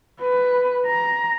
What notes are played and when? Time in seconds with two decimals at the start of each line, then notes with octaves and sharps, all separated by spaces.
0.21 B4
0.86 A#5